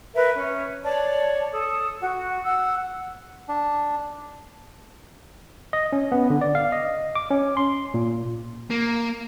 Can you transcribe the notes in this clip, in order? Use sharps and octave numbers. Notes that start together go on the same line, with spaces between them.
A#4 B4 E5
C#4
C#5 D5 A5
A4 D#6
F#4
F#5 E6
D4
D#5
C#4
B3
D3
D5
F5
D#5
D6
C#4
C6
A#2
A#3